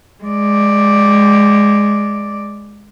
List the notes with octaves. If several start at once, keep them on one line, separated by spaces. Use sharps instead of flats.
G#3 D5